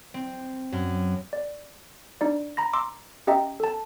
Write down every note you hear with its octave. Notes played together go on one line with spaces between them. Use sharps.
C4
F#2
D5
D4 D#4 D5
A#5 B5 A#6
A#5 C6 D6 E6
C#4 G4 D#5 E5 G5 A#5
A4 A5